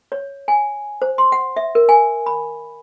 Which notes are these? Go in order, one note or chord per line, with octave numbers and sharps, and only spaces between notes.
C#5
G#5
C5
C6
F#5
E5
A#4
G#5
B5